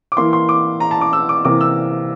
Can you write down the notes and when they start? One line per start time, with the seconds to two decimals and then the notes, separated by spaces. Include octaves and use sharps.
0.12 D6
0.17 E3 A#3 E4 C6
0.33 C6
0.49 D6
0.80 A#5
0.91 A5
1.01 D6
1.13 E6
1.29 D6
1.45 C3 E3 A#3 D6
1.61 E6